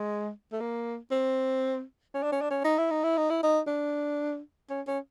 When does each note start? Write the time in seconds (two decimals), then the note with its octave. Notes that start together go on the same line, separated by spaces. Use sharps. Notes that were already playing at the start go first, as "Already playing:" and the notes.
Already playing: G#3
0.52 A3
0.60 A#3
1.11 C4
2.14 C#4
2.23 D4
2.32 C#4
2.41 D4
2.50 C#4
2.64 D#4
2.78 E4
2.91 D#4
3.03 E4
3.17 D#4
3.30 E4
3.43 D#4
3.67 D4
4.69 C#4
4.87 C#4